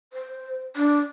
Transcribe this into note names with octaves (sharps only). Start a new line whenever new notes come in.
C5
D4